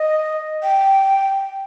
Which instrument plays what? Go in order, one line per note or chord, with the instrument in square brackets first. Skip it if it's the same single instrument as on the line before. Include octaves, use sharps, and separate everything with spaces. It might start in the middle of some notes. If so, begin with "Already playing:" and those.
Already playing: [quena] D#5
G5